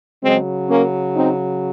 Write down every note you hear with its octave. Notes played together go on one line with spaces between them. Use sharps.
C#3 F#3 G#3 C4
A#3 C#4
C4 D#4